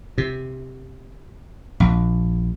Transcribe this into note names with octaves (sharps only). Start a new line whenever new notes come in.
C3
A#1